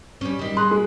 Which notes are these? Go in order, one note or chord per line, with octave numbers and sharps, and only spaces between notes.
G3 C#4
D#3 G3
G#4 C6 F#6
G#3